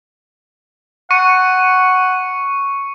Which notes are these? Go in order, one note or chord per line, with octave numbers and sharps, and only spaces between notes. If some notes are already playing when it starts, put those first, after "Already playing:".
F#5 C#6 C#7 D#7